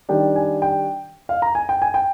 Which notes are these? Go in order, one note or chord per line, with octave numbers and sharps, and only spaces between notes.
D#3 G3 D4 G5
G#5
G5
F5
A#5
G#5
G5
G#5
G5